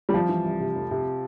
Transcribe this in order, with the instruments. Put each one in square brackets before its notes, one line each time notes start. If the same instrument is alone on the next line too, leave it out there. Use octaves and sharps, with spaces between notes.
[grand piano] G3
[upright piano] C2 [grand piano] F3
[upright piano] E3
C2
C3
F1
C3